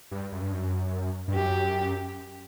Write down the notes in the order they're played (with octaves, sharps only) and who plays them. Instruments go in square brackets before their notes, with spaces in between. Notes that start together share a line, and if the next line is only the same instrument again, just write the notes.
[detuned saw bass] G2
F#2
G2
F#2
G2
[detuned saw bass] F#2 [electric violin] G4